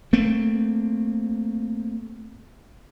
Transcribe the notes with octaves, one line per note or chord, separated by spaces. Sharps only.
A3 A#3 C4